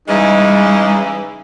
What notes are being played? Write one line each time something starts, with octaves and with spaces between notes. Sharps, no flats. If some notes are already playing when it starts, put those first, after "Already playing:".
C#3 E3 G3 G#3 D#4